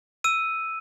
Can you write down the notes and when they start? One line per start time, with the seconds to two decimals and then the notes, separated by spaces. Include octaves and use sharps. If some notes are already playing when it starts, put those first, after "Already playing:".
0.24 E6 D#7